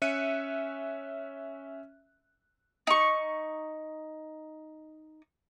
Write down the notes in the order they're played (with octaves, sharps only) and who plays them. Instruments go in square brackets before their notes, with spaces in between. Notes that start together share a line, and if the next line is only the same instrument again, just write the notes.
[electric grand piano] C#4 E5 F#6 C#7 D#7
[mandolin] D#4 C#6